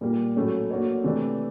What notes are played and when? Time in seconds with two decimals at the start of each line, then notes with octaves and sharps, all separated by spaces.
0.01 A#2 G3 A#3
0.36 A2 F#3 A3 C#4
0.70 A#3 D4 F#4 A4 C#5
1.04 C3 E3 A3 D4